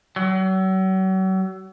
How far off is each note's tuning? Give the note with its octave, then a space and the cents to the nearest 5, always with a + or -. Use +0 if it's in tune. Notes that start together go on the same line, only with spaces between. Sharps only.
F#3 +40